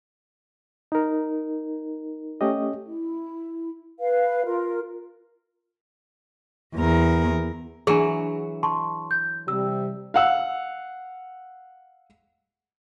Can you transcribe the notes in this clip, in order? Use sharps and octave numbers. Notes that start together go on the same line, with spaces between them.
D#4 A#4
A3 C#4 G4 D#5
E4
B4 F5
F4 A#4
E2 A#4
E3 F#3 D4 G#4
A5 C6 C#6
G6
C3 G3 E6
F5 F#5 E6